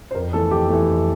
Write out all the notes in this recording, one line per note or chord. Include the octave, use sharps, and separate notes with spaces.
C5
F2 A#4
E3 A3 A4
F2 G4
E3 A3
F2